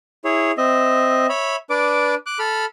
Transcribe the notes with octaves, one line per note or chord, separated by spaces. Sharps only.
E4 G#4 C#5
C4 D#5 E5
C#5 E5 B5
D4 B4 D5 D6
D6 F#6
A4 B5 F6